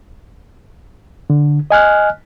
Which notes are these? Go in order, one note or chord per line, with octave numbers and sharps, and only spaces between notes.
D3
D#5 G#5 F6 F#6